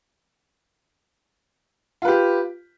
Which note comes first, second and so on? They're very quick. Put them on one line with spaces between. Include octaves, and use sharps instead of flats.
F4 B4 G4